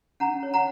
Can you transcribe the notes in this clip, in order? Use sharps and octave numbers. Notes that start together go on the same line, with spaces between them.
C#4 F#5 A#5
C#5
F#5 A#5